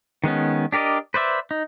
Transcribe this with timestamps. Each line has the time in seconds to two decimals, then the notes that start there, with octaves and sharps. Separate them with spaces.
0.24 D#3 G#3 B3 C#4
0.72 D4 G4 A#4 D5 D#5
1.14 B4 C5 D5 E5
1.51 D#4